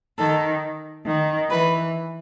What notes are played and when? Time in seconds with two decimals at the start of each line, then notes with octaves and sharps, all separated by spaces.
0.18 D#3 A4
1.06 D#3
1.51 E3 B4